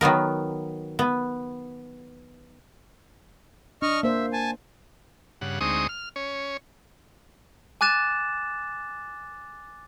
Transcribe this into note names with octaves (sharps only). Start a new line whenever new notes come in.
D#3 F#3 B3 A#4
B3
D4 D#5 C#6 F6
A#3 C5 E5
G#5 A5
G2 C#3 F#5
D2 G#3 C4 D#4 C#6 D#6
F6
C#4 C#5
G#5 D6 F#6 A6 E7